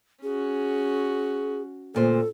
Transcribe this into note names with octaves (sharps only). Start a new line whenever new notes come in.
C#4 F#4 G#4
D2 A#2 A4 C5